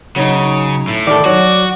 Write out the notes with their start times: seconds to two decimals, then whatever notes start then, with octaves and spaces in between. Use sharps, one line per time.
0.16 C#3 F#3 D#4
0.88 A2
1.07 D#3 A4 D5
1.25 F#3 F#4